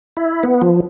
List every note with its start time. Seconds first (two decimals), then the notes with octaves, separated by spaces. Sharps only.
0.17 E4
0.43 B3
0.62 F3